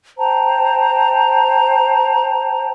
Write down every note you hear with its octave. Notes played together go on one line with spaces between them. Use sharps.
C5 G5 A5 A#5